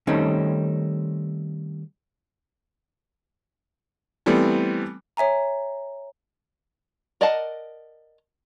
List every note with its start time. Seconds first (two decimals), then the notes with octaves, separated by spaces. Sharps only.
0.07 D#3 G3 A3 C4 C#4 D#4
4.26 E3 G3 A3 B3 C4
5.17 C#5 E5 G#5 A#5
7.21 A#4 D5 D#5 F#5 A5